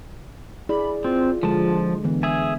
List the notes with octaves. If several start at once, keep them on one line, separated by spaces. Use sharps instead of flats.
E4 G#4 D5 B5
C4 F4
D3 F3 G#3 A4 A5
D3 E3 B3
G#4 E5 G#5